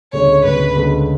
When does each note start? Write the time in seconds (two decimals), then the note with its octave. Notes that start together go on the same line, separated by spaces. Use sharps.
0.12 D2 C#3 G#3 C#5
0.44 D2 C#3 G#3 B4
0.76 D2 C#3 G#3